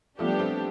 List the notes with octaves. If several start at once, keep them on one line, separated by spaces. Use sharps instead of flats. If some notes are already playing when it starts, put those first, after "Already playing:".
F3 G3 A3 B3 D4 G4
A3 C4